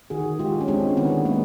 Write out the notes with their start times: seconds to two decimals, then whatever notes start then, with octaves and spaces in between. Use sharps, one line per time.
0.10 D#3 F#4 G#4
0.39 G#3 F4 G4
0.61 C#4
0.68 G#3 C4 D4
0.97 D#3 B3 C#4
1.25 G#3 A#3